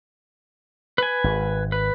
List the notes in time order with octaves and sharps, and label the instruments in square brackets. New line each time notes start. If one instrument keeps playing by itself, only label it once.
[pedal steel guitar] B4 G#5
[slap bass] G#1
[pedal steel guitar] B4